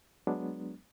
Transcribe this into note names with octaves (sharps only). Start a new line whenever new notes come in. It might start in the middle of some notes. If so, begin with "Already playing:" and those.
F#3 G#3 B3 D4